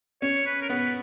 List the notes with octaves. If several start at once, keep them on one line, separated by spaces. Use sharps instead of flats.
C#4 C#5
B4
A#4
B3 B4